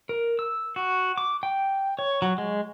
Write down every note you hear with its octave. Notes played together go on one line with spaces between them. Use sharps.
A#4
E6
F#4
D6
G5
C#5
F#3
G#3